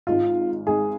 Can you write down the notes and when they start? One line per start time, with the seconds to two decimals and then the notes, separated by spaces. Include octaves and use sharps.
0.07 G#1 G#2 G#3 D#4 F4
0.67 G#1 G#2 G#3 D#4 G#4